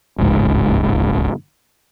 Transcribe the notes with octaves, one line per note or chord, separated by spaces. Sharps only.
D1 G1 C#2 G#2